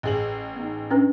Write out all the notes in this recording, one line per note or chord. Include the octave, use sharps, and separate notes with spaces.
A1 G#4 F#7
B3 D#4
C#4 D4 B4